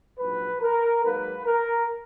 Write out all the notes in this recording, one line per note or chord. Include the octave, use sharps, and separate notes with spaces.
A#1 G#2 F#3 B4
A#4
G#2 F#3 A#3 B4
A#4